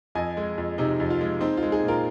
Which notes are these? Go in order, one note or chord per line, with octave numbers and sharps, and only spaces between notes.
F2 D#5 G#5
G#3
F2
C3 D#4
F2
F4
G#3
C4 D#4
F4
G#3
D#4 G#4
A#2
F4 A#4